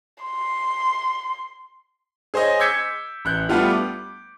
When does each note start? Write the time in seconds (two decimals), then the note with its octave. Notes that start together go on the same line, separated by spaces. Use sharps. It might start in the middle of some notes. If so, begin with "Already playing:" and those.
0.24 C6
2.34 G#4 C5 C#5 D#5 G#5
2.59 D6 E6 G6 G#6 B6 C#7
3.25 A1 F#6 G6
3.49 G3 A3 B3 D4 F4 G4
3.70 D6